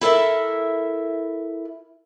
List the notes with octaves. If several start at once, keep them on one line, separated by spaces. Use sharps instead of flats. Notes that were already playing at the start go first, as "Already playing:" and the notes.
E4 A4 A#4 E5